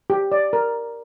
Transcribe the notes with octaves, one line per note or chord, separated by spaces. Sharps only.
G4
D5
A#4